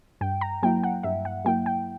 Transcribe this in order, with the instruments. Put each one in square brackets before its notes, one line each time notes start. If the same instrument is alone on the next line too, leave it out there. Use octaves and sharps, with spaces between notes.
[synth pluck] G2 G5
A#5
F#3 A#3 E4 G5
F#5
G2 E5
F#5
F#3 A#3 E4 G5
G5